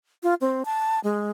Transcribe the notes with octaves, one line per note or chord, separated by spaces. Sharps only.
F4
C4
A5
G#3